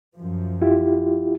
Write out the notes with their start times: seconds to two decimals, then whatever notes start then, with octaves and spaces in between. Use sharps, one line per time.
0.16 F#2 F3
0.61 E4 F4 G4